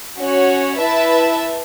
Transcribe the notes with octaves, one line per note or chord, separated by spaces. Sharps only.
C#4 F#4 C#5
E4 B4 E5 A5